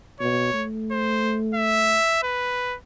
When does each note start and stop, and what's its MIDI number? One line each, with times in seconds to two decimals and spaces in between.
0.21 0.50 47
0.21 0.66 73
0.53 1.98 57
0.91 1.38 72
1.55 2.19 76
2.23 2.76 71